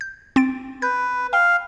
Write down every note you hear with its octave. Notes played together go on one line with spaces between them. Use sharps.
G6
C4 A6 D7
B4 G6
F5 G5